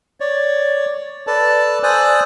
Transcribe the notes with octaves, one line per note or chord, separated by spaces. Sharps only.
C#5 D5
A4 B4 D5 A5
C5 D5 G#5 D#6 E6 F#6